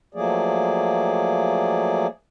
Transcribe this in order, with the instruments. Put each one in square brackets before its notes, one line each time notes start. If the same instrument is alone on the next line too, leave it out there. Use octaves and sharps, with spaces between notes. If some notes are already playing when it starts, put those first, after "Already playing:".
[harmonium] F3 F#3 A3 A#3 G#4 D5